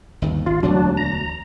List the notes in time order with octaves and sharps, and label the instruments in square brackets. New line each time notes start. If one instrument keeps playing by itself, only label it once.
[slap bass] G1 D#2
[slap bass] G#1 [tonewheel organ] F4
[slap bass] E1 D2 [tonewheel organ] F#3 D4
[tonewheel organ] A#5